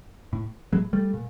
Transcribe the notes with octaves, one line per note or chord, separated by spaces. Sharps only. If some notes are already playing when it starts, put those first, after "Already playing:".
A2
A2 F#3 G#3
G3 A3
A#2